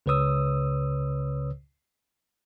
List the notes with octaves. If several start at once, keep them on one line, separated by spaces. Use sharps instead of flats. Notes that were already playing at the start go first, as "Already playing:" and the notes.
C#2 C#3 B4 C#5 D#6 E6